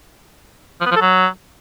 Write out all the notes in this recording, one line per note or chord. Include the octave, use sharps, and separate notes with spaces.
F3
B3
F3
A4
F#3